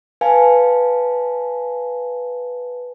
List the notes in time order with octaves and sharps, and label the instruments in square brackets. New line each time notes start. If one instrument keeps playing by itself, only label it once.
[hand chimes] B4 F5 G#5 A5